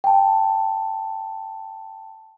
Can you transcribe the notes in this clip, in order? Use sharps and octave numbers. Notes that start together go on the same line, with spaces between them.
G5 A5